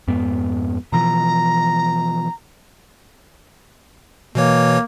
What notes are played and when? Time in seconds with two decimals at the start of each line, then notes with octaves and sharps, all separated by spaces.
0.08 F2 G#2 B3
0.92 B2 E3 F3 A#5
4.35 B2 E3 A#3 C#5